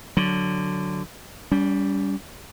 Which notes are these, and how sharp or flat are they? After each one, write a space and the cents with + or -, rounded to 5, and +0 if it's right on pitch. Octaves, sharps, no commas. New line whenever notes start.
D3 +0 F#3 +0
G3 +0 C#4 +40